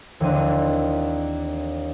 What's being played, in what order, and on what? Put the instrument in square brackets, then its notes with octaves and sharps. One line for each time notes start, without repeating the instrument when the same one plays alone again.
[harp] D#2 D3 E3 C4 D4 D#7